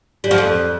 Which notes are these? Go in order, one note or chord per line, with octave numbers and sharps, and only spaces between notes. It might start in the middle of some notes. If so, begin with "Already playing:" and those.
G3
F3
F2